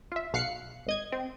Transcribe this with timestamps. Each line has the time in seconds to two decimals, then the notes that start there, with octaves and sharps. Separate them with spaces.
0.12 F4 E5
0.33 B1 B2 F5 F#6 C7 C#7
0.87 G#1 D#5 G#6
1.12 C4